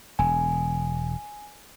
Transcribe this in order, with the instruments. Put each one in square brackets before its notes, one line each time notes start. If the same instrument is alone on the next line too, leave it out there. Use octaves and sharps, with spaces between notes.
[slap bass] E1 [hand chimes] G#5